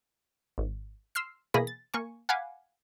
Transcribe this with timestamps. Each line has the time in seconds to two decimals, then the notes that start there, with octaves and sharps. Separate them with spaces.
0.58 G#1
1.15 C6 E6 F6 C7
1.54 B2 E3 A#3 G#4 B5 A#6
1.67 A6
1.94 A#3 G#5 C#6
2.29 F5 F#5 G#5 B5 D6